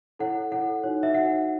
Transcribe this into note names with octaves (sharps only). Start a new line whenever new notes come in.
E4 A4 C#5 F#5
E4 A4 C#5 F#5
D#4 F#4 C#5
E5
D#4 F#4 C#5 F#5